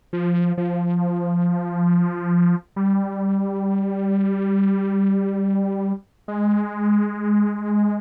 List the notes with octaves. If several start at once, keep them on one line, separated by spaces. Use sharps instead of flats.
F3
F3
G3
G#3